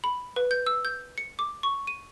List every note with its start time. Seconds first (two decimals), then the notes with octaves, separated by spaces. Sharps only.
0.04 B5
0.36 B4
0.51 G6
0.66 E6
0.85 G6
1.18 C#7
1.39 D6
1.63 C#6
1.87 D#7